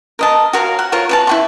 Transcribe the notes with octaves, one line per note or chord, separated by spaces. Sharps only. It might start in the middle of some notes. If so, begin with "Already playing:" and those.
A#4 D#5 A5
F#4 A#4 C#5 F5
F#5
F4 A#4 C#5
B4 C#5 A5
E4 F#4 C#6